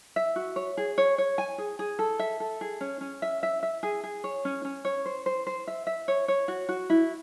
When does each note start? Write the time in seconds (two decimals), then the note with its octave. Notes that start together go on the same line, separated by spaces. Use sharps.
0.16 E5
0.36 F#4
0.56 C#5
0.77 G#4
0.98 C#5
1.18 C#5
1.38 G#5
1.58 G#4
1.79 G#4
1.99 A4
2.19 E5
2.40 A4
2.61 G#4
2.81 C#4
3.01 C#4
3.22 E5
3.43 E5
3.63 E5
3.83 G#4
4.03 G#4
4.24 C#5
4.45 C#4
4.65 C#4
4.85 C#5
5.06 C5
5.26 C5
5.47 C5
5.67 E5
5.87 E5
6.08 C#5
6.28 C#5
6.48 F#4
6.69 F#4
6.90 E4